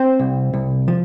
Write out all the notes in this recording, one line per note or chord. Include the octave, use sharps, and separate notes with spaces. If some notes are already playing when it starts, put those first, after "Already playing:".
Already playing: C4 C5
C2
C2
F3